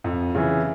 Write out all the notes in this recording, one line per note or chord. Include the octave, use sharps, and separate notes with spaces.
F2
C#3 E3